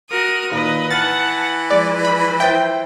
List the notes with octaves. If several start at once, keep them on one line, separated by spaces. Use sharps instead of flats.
F#4 A#4 D#6
A#2 D#3 B4 D#5
E3 F#5 A5 F6 A6
F3 G#3 D5
B5
E4 C5 G5 A6